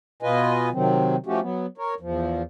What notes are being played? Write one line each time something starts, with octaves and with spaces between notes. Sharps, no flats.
B2 F4 B4 D#5 G#5
C3 D#3 F#3 C4
F3 A3 C#4 F#4 G4
F#3 B3
A#4 C#5
E2 F3